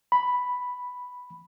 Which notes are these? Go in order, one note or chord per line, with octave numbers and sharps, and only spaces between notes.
B5